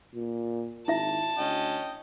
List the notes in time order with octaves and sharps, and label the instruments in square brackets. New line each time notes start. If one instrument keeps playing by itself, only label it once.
[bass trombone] A#2
[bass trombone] G#1 [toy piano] E4 E5 [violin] A5
[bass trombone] D2 [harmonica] C#4 D#5 G5